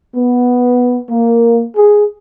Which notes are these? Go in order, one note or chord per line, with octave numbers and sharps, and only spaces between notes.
B3
A#3
G#4